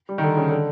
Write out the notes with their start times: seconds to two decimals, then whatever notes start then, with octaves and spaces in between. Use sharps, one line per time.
0.09 G3
0.18 D#3
0.23 D3
0.37 C#3
0.49 D3